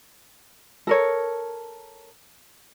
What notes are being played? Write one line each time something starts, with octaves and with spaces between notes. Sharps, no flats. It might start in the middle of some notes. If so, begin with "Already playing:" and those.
A4 A#4 C#5